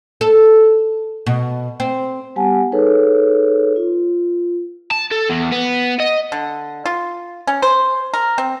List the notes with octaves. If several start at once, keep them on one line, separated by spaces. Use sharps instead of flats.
A4
B2
C4
G3 B3 G4 F#5 G#5 A5
D#4 G#4 A4 B4 C#5
F4
A5
A4
E2
B3
D#5
D3
F4
C#4
C5
A#4
C4